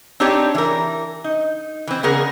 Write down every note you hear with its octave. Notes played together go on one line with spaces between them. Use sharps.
C4 D4 D#4 G4 C#5 D5
E3 A#4
D#4
E3 C4
C#3 B3 G#4 A#4 D5